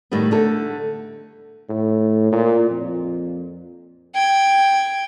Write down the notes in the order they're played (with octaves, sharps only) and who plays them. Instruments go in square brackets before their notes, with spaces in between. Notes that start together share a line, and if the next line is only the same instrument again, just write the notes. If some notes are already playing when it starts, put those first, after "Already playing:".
[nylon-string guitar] A2 D#3 G3 B3
D3 A3 A4
[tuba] A2
A#2
F2
[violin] G5 G#6